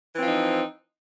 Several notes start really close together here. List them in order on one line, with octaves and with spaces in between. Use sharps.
E3 C4 F3 D#4